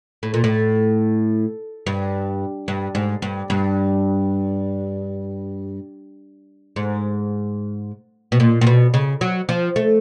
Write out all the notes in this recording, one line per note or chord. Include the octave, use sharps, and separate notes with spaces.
A2
A#2
A2
G2
G2
G#2
G2
G2
G#2
B2
A#2
A#2
B2
C#3
F#3
F3
A3